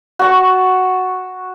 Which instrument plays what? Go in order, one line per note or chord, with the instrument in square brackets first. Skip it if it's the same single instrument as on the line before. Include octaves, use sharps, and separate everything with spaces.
[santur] F#4 A5 C#6